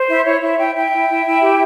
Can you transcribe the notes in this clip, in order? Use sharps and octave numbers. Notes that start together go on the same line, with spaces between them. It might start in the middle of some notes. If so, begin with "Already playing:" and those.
Already playing: C5
E4 E5
E4 C#5
E4 E5
E4 E5 G5
E4 E5 G5
E4
E4
E4
G4